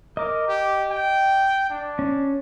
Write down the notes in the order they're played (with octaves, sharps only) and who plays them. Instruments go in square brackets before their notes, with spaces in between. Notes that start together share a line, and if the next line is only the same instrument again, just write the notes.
[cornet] A#4 [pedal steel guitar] D#5 D6
[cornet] G4
G5
D4
[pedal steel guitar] C#4